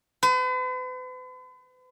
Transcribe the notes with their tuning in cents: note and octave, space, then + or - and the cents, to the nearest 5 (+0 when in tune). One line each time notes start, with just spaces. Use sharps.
B4 +45